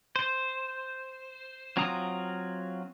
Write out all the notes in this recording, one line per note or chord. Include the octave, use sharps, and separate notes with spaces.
C5
F#3 C4 F4 A#5 D#6